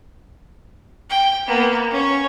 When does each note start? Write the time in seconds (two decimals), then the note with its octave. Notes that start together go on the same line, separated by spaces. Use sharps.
1.10 G5
1.46 A#3 B3
1.91 C#4 C#5